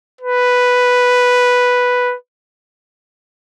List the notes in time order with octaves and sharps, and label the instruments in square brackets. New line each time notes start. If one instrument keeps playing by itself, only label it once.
[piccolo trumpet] B4